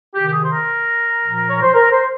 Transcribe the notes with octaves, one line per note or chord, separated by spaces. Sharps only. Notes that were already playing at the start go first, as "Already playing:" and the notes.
C3 D#3 G4
G4
G#4
C5
A#4
A#2 F3
C#5
C5
A#4
C5